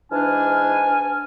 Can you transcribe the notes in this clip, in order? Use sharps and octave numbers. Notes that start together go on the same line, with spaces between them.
G#2 E3 D4 G#5 F6